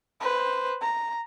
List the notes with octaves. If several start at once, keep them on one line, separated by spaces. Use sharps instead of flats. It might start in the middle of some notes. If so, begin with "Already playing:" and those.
B4 C5
A#5